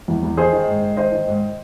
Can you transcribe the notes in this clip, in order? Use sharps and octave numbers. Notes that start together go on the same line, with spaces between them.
E2
E2
D#3 G#4 C5
D#3
G#2
G#2
D#3 C5 D#5
D#3
G#2